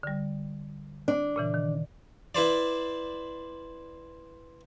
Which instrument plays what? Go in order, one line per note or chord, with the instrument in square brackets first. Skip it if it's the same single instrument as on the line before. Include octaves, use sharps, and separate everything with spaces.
[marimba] D3 G3
[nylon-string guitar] D4
[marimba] A#2 C#3 E3
D#3
[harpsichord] E4 B4 C5 D5